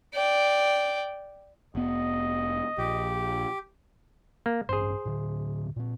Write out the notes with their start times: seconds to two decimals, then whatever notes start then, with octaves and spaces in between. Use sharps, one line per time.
0.14 D5 G5
1.75 F1 B3 D#5
2.78 A#1 G4
4.46 A#3
4.69 A1 G2 C#4 G#4 C5
5.06 A2 D3
5.76 A#2 C4